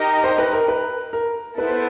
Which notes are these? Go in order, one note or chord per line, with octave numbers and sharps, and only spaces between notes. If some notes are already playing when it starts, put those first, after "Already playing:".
Already playing: D#4 G4 A#4 D#5
C5
B4
A#4
B4
A#4
B3 E4 A4 B4 C5